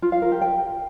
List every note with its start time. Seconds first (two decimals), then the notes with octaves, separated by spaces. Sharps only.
0.02 F4
0.12 F5
0.22 A#4
0.32 G4
0.42 G5